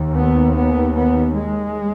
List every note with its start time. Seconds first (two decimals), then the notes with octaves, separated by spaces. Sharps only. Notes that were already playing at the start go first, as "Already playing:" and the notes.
Already playing: D#2
0.17 B3
0.56 B3
0.97 B3
1.37 G#3